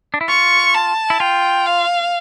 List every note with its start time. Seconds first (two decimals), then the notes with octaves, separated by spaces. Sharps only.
0.14 D4
0.21 E4
0.28 F4 C#6
0.74 A5
1.10 E4
1.20 F4 G5
1.67 F5